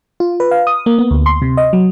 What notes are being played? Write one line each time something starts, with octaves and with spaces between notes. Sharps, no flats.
F4
B4
F5
D#6
A#3
B3
D2
C6
C3
D#5
F#3